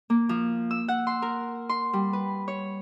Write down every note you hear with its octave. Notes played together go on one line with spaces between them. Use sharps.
A#3
F3
E6
F#5
C6
A#4
C6
G3
B4
C#5